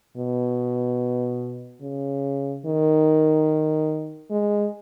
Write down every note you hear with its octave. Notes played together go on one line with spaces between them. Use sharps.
B2
C#3
D#3
G#3